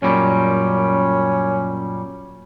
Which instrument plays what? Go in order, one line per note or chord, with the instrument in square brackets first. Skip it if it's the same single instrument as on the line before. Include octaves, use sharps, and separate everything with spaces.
[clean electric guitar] F#2 A#2 G3 [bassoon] C#4